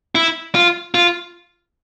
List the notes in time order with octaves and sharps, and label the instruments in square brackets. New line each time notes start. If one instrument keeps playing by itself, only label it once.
[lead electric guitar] E4
F4
F4